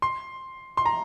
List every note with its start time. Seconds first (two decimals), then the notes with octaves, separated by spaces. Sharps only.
0.02 C6
0.77 C6
0.86 A#5